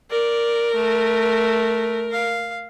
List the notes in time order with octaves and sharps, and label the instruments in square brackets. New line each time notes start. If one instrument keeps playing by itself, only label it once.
[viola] A#4 [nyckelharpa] D5
[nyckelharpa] A3
F5